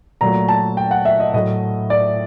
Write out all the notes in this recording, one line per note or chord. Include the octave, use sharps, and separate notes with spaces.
A#2 F#3 A3 A#5
A5
G5
F#5
E5
D#5
A2 F#3 A3 D#5
D5